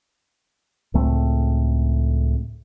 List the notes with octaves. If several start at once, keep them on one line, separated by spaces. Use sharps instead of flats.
C#2 A2 A3 C4